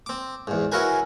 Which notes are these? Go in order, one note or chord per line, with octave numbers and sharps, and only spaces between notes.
C4 D6
E2 G#2
C#4 E4 F#4 A#4 B4 G#5